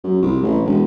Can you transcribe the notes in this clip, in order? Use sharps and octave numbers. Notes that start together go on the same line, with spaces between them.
F#2
C2
A1
E1